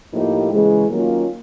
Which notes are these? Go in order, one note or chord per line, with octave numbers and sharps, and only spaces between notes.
A2 F3 A#3 D#4 G4
C#3 E3 G#3
D#3 F#3 A#3 C#4 F4